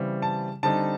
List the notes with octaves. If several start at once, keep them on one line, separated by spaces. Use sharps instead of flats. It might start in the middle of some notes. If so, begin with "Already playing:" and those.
Already playing: C#3 E3 G3 C4
A5
D3 G3 C4 D#4 A5